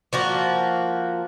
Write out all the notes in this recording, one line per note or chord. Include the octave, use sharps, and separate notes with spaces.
F3 A#3 F#4